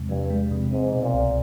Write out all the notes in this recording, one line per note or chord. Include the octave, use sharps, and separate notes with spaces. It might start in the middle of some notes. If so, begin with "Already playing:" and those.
Already playing: E2 C3 G#3
G2 F3
G#3
C3
G#2 C4
B2
A#2
C2